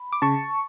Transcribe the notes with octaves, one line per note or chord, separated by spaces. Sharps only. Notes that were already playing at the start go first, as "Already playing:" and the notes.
Already playing: B5
D6
C#3 A5 C#6